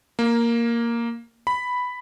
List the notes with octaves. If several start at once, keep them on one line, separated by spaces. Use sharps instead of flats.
A#3
B5